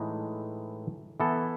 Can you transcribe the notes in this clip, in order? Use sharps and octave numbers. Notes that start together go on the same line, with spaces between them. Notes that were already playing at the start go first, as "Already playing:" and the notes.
Already playing: A2 E3 G#3 D#4
E3 B3 E4 A4